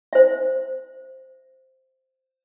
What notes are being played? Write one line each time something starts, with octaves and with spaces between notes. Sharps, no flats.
C5 E5